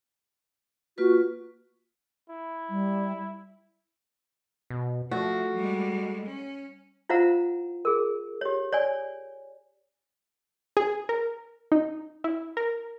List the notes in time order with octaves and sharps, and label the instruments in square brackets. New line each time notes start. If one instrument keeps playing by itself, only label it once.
[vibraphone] A#3 F4 B4 [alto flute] F#4
[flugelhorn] E4
[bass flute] G3
[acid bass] B2
[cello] F3 [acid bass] A3 [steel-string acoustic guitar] F#4
[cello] G3 G#3
C#4
[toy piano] E4 F4 C5 F5 F#5 A#5
G#4 A#4
G4 C#5
C#5 D5 G#5
[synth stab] G#4
A#4
D#4
E4
A#4